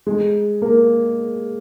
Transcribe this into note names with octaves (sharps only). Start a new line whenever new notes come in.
G#3
A#3